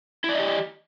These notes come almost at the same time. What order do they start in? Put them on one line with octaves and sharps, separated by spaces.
E4 D5 D#5 G4